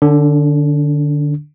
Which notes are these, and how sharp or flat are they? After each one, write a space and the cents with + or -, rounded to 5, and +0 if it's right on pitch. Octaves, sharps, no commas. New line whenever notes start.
D3 +20 D4 -35